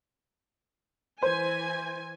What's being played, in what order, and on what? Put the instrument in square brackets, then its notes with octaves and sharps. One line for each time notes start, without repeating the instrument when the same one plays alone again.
[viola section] E3 G#5 [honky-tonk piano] C5